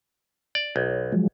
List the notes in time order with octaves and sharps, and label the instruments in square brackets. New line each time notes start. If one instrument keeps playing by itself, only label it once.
[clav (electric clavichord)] D5
B1
[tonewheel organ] F3 F#3 G#3